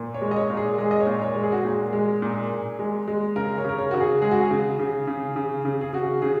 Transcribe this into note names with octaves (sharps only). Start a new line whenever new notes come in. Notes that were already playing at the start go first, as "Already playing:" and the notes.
Already playing: A#2
C#5
G#3
D#5
C#5
A#2
G#4
G#3 G#4
D#5
C#5
A#2
C#5
G#3
G#4
F#4
A#2 G#4
G#3
A#2
A#2
G#3
G#3
C#3 A#4
C#5
C#3 A#4
C#5
C#3 F#4
G#4
G#3 G#4
F#4
G#4
C#3
C#3
C#3
C#3
C#3
G#4
C#3 F#4
C#3 G#4